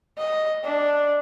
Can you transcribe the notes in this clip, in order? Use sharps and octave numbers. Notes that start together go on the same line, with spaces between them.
D#5
D4